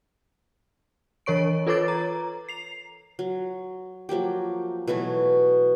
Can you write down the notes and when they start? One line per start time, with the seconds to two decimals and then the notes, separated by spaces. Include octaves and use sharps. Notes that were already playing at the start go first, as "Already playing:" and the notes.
1.26 E3 A#4 C#5 C#6 D7
1.67 F4 A4 B4 C#5 D6 A6
1.88 A#5
2.49 C7 F7
3.19 F#3
4.09 F3 F#3 A#3 G4
4.88 B2 E3 F#3 A3